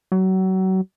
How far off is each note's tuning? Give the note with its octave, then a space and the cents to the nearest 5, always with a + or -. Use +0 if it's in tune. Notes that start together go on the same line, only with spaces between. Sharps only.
F#3 +30